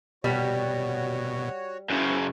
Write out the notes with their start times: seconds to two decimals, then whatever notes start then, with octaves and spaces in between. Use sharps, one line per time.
0.24 B2 G3 F#4 C#5
1.90 F#2 C#3 B3 E4 C5